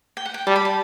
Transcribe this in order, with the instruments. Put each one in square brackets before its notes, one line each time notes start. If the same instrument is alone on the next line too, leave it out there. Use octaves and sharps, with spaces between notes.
[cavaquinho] G5
F#5
G5
[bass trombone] G3 [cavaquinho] A5
[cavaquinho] B5
A5